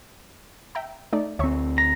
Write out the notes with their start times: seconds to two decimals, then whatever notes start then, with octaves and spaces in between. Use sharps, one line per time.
0.75 E5 G5 A#5
1.13 A3 D#4 D5
1.39 D2 C4 C#5 E5 C#6
1.78 A#5